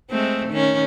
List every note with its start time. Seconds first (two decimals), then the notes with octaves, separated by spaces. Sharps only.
0.10 G#3 A3 C4
0.49 D#3 C#4